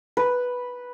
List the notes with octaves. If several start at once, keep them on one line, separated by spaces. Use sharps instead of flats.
B4